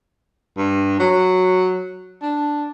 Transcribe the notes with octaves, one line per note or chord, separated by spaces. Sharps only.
G2
F#3
D4